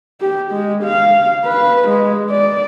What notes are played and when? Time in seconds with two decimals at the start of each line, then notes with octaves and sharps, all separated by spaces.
0.21 G4
0.52 G#3
0.84 F5
1.46 B4
1.89 G#3
2.30 D5